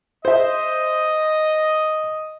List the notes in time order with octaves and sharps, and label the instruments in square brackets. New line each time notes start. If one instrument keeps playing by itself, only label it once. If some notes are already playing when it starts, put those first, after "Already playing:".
[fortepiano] C5 E5 [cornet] D#5